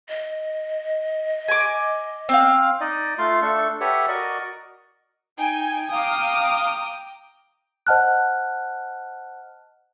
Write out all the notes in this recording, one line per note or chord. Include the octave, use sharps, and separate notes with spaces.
D#5
G#5 D6
C4 F5
D#4 D5 D#5
A3 F4 F5 C6
A3 D4 A4 C#6
G4 A4 B4 C#5 E5 F#5
F#4 A#4 D5 D#5 C#6
D#4 G5 G#5
F5 A#5 D6 D#6
C5 D#5 F#5 A5 F6 F#6